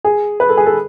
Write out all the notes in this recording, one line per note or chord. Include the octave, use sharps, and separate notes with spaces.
G#4
B4
A4
G#4
A4